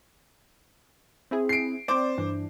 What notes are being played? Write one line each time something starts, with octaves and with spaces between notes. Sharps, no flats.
C4 E4 G#4
C7 D7
C4 C5 D5 D6
G2 E3 D4